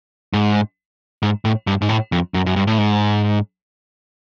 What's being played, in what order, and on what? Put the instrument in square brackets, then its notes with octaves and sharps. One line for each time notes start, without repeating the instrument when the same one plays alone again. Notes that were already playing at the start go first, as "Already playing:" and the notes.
[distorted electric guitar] G#2
G#2
A2
G2
G#2
A2
F2
F#2
F#2
G2
A2
G#2